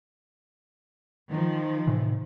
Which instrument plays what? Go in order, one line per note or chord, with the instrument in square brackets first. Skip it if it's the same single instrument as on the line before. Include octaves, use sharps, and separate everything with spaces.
[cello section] D#3 F3
[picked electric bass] A2 C3 E3